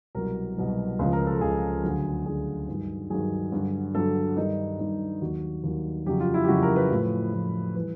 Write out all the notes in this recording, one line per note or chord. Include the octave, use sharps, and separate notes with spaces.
C2 B2 F#3 A#4
C2 B2 F#3
C#2 C#3 F3
A#4
A4
C#2 C#3 F3 G#4
D2 D3 F#3
D2 D3 F#3 G#4
G2 D#3 F#3
G2 D#3 F#3 G#4
G2 D3 F#3
G2 D3 F#3 A4
G2 D#3 G3 D#4
G2 D#3 G3
D#2 D#3 F#3 F#4
D#2 D#3 F#3
F2 C#3 F#3 G4
F4
E4
G4
F2 C#3 F#3 F#4
A#4
B4
A2 F3
A2 F3
E3 G3 B4